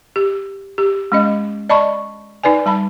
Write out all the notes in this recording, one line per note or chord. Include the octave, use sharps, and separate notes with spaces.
G4
G4
G#3 C#4 D#5
D5 D#5 A5 B5 C#6
D#4 B4 D5 G#5
G3 A5 B5